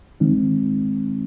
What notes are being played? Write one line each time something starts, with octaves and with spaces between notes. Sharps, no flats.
D#3 G#3 C4 D#4